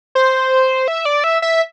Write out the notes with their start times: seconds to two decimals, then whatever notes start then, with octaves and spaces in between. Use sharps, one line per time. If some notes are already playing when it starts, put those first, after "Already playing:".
0.15 C5
0.88 E5
1.05 D5
1.24 E5
1.42 E5